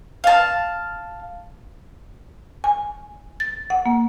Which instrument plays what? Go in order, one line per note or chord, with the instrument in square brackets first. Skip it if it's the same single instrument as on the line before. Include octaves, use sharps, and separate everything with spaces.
[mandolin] F5 A5
[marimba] G#5
A6
F#5
A#3